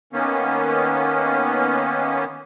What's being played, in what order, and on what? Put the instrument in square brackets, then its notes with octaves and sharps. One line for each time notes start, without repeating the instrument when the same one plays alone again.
[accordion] D#3 A#3 B3 C#4